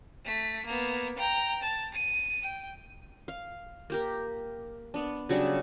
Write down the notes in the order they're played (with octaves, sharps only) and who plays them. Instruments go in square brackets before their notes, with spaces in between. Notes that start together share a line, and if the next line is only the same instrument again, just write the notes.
[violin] A3 B6
A#3 B3
G5 A#5
A5
D#7
G5
[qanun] F5
A#3 G4 A#4
B3 D4
C#3 F#3 G3 D4